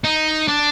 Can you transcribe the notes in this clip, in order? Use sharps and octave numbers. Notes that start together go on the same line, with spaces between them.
D#4
D4